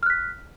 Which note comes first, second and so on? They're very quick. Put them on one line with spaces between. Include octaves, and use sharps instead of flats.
F6 F#6 B6